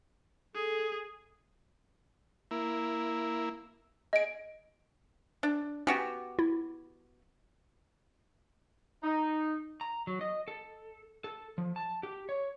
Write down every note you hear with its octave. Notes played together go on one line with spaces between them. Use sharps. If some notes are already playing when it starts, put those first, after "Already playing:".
G#4 A4
A#3 E4
G#4 D#5 D7
D4
B3 C#4 F#4 G4
E4
D#4
A#5
F#3
D#5
A4
A4
F3
A5
G4
C#5